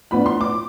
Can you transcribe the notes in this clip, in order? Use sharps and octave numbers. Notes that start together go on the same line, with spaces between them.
A2 F3 B3 D4 B5
C6
D6